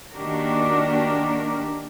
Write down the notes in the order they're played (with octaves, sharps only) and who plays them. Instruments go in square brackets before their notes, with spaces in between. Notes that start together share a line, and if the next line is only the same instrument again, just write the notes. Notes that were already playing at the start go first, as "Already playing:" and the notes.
[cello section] D#3 A#3 D4 F#4 G4 A#4